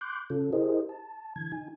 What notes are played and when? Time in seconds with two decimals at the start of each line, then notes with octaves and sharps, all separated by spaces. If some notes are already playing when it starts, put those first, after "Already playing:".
0.01 C6 D6 F#6 G6
0.30 C#3 C#4 F4 A4
0.53 E4 G4 G#4 A#4 C5 D#5
0.89 A5
1.36 D3 E3 G#6
1.52 D#4 G#5